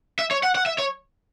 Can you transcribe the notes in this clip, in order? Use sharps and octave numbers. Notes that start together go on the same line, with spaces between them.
E5
C#5
F#5
F#5
E5
C#5